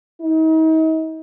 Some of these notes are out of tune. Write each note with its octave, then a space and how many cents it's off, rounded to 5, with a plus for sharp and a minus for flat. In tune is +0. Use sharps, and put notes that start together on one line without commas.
D#4 +40